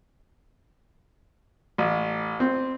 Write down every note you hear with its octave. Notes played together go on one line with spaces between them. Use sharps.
A1
C4